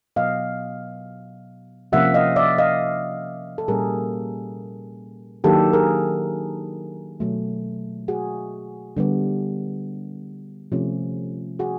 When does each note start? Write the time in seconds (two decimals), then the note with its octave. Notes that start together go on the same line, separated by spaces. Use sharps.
0.16 B2 F#3 B3 D#5 F5
1.92 C3 F3 A#3 C#4 F4 E5 F#5
2.14 D#5 F5
2.36 D5 E5
2.58 D#5 F5
3.58 A4
3.68 A#2 G3 A#3 C#4 G#4 A#4
5.44 D#3 F#3 A#3 D4 G4 A4
5.73 G#4 A#4
7.20 B2 F#3 A3
8.08 F#4 G#4
8.97 D3 G3 B3
10.72 C3 F3 A3 C#4
11.59 F#4 G#4